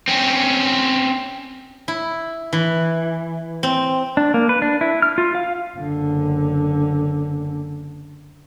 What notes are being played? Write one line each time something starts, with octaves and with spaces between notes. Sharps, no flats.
C4 C#4
E4
E3
C4
D4
A#3
B4
D4
E4
F6
F4
F5
F#1 D3